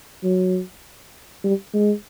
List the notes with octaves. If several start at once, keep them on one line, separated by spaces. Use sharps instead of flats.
F#3
G3
G#3